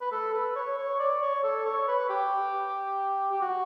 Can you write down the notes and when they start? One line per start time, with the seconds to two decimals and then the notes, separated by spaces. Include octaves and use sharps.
0.01 B4
0.11 A4
0.33 B4
0.55 C#5
0.78 C#5
0.99 D5
1.22 C#5
1.44 A4
1.66 C#5
1.88 B4
2.10 G4
3.32 G4
3.42 F#4